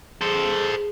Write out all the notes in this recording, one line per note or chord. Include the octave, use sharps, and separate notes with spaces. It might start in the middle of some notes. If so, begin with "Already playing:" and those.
G#4 A4 C5